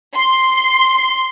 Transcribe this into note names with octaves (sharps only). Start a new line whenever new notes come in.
C6